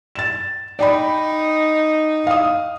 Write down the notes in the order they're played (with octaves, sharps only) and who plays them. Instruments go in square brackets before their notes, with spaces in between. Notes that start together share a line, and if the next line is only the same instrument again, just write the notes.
[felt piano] A6 E7
[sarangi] D#4 [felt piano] D5 G5 B5
[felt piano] F5 D#6